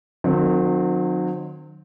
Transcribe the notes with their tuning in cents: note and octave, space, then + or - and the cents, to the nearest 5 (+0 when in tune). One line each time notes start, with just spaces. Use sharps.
D#3 -40 F#3 -35 C4 -10